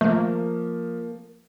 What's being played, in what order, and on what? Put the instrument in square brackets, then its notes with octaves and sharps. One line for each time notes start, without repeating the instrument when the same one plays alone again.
[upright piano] F3 [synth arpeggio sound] A3 [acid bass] A#3